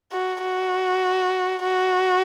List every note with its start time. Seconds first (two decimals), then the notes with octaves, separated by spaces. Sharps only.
0.12 F#4
0.42 F#4
1.63 F#4